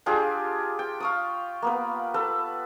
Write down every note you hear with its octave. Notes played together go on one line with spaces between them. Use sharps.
D4 F4 G4 G#4
G5
F5 C#6 D#6
A#3 B3 B4
A4 B4